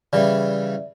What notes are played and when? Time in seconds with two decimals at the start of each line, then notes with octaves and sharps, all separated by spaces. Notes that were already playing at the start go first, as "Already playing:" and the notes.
0.13 C#3 E3 G3 D5 E5